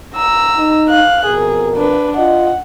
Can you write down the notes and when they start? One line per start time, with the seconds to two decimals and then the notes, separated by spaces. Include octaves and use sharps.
0.16 A#5 E6
0.57 D#4
0.89 F5 F#6
1.26 F2 B2 G#4 A#4
1.77 D4 B4
2.17 F4 D#5 F#5